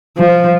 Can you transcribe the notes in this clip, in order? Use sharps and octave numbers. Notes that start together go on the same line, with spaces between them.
F3